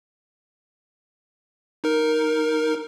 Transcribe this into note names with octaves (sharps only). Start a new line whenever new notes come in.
D#4 A#4